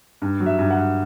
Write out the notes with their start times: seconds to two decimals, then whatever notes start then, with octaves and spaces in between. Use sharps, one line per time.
0.22 G2
0.40 F#3
0.46 E5
0.59 G2
0.71 F#5
0.77 G2